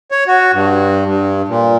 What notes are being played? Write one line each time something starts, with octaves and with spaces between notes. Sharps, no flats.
C#5
F#4
G2
G2
A#2